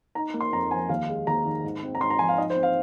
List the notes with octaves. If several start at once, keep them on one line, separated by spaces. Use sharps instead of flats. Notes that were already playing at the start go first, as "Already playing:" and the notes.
D#4 A#5
A#3
C6
F2 A#5
F3 G#5
D#2 F5
G#3
D#2 A#5
D#3
G#2
C4
A#5
G#2 C6
A#5
F3 G#5
F5
D#4 D#5
C5
C4
F5